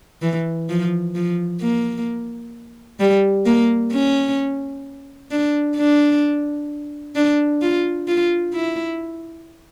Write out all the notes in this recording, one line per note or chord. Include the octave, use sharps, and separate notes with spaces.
E3
F3
F3
A#3
G3
A#3
C#4
D4
D4
D4
F4
F4
E4